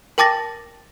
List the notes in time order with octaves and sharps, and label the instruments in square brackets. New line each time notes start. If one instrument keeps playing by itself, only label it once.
[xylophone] A#4 G5 A5 D6 A6 A#6